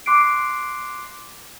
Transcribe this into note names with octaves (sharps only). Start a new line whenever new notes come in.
C6 D6 F#6 C7 D7